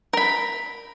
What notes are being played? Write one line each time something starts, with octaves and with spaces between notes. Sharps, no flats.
A#4 B5